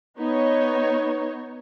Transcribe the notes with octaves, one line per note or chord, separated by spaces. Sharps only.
B3 D#4 C#5